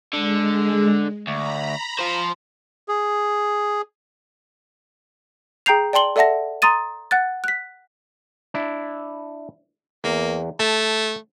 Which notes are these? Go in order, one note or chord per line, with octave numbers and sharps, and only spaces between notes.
D3 G#3
D2 A#5 B5
F4 C5
G#4
G#4 G5 A#5 G6 C7 F7
D5 G5 A5 C6 F#7 G7
A4 D5 E5 F#5 A5 A#6
A#5 C6 D#6 A6 D#7
F#5 F#6 A6
F#6 B6
D4 E4
E2 A#3
A3 A5